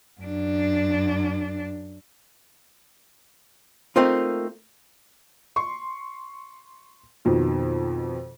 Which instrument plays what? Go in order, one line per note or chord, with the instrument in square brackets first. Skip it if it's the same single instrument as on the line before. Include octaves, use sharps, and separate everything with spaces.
[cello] F#2 D4
[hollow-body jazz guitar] A3 A#3 C4 D#4 F4
[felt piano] C6 C#6
F2 B2 D#3